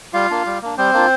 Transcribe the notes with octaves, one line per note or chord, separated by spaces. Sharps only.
G3 F4 F5
A#3 D4
G3
A#3 D4
G3 C4 C5
A#3 D4 F4